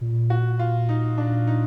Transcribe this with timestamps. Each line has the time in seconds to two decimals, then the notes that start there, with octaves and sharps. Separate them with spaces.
0.01 A#2
0.30 F#4
0.59 F4
0.89 D#4
1.18 D4
1.47 D#4